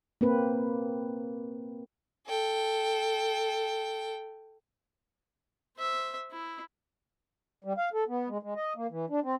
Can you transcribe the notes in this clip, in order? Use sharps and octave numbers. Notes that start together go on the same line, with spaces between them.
A#3 C4 B4
A4 G5
C5 E5
E4
G3
F5
A4
B3
G#3
G#3
D#5
A#3
E3
D4
C4